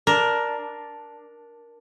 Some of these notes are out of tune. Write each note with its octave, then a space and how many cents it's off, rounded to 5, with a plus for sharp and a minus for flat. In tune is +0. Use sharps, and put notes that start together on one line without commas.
D4 +0 A#4 +10